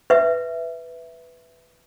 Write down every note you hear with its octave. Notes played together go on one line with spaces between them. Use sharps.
B4 E5